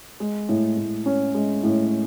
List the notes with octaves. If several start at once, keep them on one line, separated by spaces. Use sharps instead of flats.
G#3
A2
A2
C#4
G#3
A2